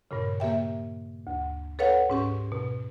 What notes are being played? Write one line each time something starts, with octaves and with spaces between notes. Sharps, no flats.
G2 A#2 C#3
A#3 G4 E5 G5
D2
A4 B4 C#5 F5 F#5
G#2 C#4 G4
B2